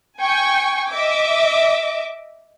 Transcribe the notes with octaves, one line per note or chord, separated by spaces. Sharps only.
G5 G#5 C#6
D#5 E5 D6